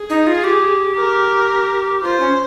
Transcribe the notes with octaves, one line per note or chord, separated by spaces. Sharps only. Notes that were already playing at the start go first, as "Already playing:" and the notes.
Already playing: G#4
D#4
F4
G4
A#4
F4 C5
C#4